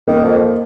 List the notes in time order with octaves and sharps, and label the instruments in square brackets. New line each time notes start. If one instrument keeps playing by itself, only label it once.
[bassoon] D#3 [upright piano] A#3
[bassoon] F2